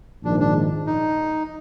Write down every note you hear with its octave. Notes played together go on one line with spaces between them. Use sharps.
A#1 G#2 D#3 D4
D4
D#4